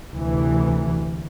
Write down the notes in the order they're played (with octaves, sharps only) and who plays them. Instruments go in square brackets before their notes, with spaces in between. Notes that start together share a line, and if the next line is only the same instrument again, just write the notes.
[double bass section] D2 C3 E3